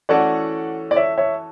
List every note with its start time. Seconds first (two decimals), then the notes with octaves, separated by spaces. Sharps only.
0.09 E3 A3 C#4 F#4 A4 D5 F#5
0.91 D5
0.96 C#5 E5
1.17 C#5 E5